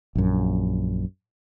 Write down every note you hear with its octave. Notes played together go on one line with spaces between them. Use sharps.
A#1 F#2